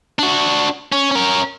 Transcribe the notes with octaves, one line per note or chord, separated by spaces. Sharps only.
D4 F#4
C#4
C#4 A#4